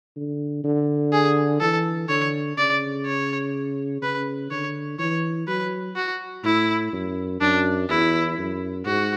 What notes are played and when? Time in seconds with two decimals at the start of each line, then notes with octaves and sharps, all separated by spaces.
0.16 D3
0.64 D3
1.13 G#4
1.61 E3 A4
2.09 D3 C#5
2.57 C#3 D5
3.06 C#5
4.02 C#3 B4
4.51 D3 C#5
4.99 E3 C#5
5.48 F#3 B4
5.96 F#4
6.44 A2 E4
6.93 F#2
7.41 F#2 D4
7.89 E2 E4
8.38 F#2
8.86 G#2 F#4